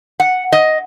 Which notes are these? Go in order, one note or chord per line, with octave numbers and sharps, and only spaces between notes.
F#5
D#5